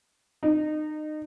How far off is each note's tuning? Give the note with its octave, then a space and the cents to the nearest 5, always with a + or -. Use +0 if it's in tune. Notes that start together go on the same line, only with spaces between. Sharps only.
D#4 -25